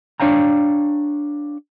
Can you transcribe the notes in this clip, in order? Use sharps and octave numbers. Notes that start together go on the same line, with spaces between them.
D4 C#5 F5 G5 A#5